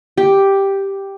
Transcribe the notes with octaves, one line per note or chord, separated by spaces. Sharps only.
G4